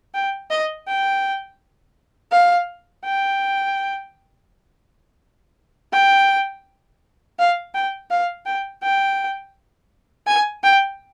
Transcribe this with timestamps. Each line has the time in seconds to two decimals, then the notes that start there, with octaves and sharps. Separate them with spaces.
0.14 G5
0.50 D#5
0.88 G5
2.32 F5
3.04 G5
5.93 G5
7.39 F5
7.74 G5
8.11 F5
8.46 G5
8.83 G5
10.27 G#5
10.63 G5